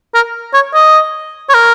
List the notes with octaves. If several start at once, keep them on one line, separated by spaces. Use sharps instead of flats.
A#4
C#5
D#5
C#5
A#4